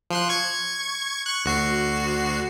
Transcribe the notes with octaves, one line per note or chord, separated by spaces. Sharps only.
F3 C6 F#6
C#6 G#6
C#6 F#6
D2 F#4 C7